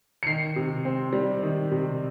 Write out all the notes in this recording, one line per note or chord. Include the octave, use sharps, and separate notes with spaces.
C#7
D#3 C7
C3
C4
G3
D#3
C3